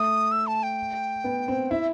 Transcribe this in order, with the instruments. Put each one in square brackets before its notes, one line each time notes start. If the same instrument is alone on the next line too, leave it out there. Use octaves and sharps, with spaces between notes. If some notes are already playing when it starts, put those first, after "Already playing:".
Already playing: [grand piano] A3 [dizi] D#6
[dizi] E6
A5
G5
[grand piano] B3
C4
[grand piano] E4 [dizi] E5